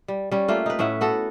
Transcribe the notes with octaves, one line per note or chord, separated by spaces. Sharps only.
G3
G3 C#4
A3 A#3 F4 G4
D#4 B4
A2 C#4 E5 F#5
B3 F#4 A4